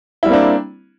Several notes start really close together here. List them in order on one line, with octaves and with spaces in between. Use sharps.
E4 G3 C4 A#3 D4